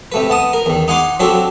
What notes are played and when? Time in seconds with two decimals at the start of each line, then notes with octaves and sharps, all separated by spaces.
0.12 C3 A3 B4
0.30 B3 A5 D#6
0.53 A#4
0.66 E2 D#3
0.88 D#4 F#5 G#5 C6 D6
1.20 F#3 C4 D4 F#4 G4 A4